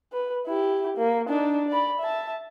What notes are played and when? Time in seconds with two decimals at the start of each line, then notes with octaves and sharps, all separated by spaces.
0.13 B4
0.46 E4 G4
0.97 A#3
1.29 D4 D#4
1.68 D5 B5
1.99 E5 A5